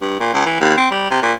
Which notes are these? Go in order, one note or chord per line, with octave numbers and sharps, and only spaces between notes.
G2
A#2
C#2
E3
D#2
C4
G3
C3
A#2